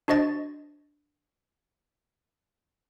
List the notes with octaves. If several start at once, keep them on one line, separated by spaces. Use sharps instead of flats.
D4 F#4 C5 D#5 A6